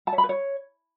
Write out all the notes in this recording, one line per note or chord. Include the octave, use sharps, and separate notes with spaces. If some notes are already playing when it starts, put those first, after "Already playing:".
A5
C#5
B5
B4
C#5